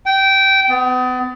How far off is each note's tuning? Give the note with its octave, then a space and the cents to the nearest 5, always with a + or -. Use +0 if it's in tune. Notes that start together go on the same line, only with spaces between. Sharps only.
G5 -15
B3 +35